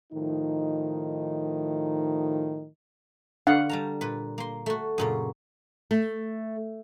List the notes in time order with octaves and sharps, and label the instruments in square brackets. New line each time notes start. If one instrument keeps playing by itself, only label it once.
[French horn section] A2 D#3 F3 D#4
[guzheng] D3 [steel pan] D4 F5 F#5
[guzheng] G3 A5 A#5
A#2 B4
A#3 C6
A3 F#4
F#2 A#2 C#3
[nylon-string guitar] A3